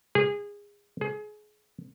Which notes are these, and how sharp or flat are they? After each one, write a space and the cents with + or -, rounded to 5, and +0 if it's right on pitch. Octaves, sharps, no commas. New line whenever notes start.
G#4 -25
G#4 +25